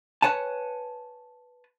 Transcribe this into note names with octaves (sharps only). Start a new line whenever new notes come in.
B4 C#5 F#5 G#5 A5